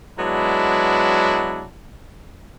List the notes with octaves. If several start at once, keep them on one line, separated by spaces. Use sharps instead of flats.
F#3 G#3 B3 D4 E4